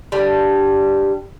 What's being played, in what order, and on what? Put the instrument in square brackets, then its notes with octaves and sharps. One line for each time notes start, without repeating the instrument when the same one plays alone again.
[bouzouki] D3 G3